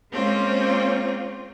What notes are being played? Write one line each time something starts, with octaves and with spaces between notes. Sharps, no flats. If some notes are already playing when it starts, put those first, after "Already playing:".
G#3 A#3 C4 C#4 F4